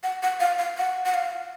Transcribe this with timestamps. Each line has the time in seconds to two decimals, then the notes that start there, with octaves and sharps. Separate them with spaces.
0.03 F#5
0.23 F#5
0.40 F5
0.59 F5
0.77 F#5
1.06 F#5
1.14 F5